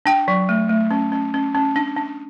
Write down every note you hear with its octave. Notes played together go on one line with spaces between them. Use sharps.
D4 G5
F#3
A3
A3
C#4
C#4
C#4
C#4
D4
D4